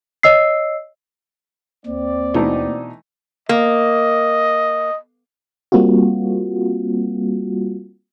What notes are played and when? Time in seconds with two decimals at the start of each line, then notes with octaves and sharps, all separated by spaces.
0.23 C#5 D#5 E6 C7
1.86 D#2 C4 D5
2.34 B2 E3 A3 D#4
3.49 A#3 D#5
5.72 G3 A#3 C4 F4 F#4